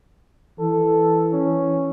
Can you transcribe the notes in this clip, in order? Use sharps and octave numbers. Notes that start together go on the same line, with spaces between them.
E3 A4
C#4